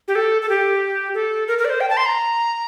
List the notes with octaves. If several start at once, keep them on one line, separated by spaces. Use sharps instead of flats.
G4
A4
A4
G4
A4
A#4
A#4
D5
C5
G5
A5
C6
A#5